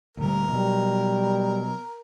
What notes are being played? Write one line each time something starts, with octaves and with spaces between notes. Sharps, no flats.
D2 A#2 G3 A#4
B2 F#3 G3